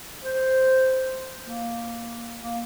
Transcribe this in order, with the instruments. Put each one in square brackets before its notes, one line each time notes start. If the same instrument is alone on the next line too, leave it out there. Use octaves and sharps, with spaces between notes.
[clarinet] C5
A#3
A#3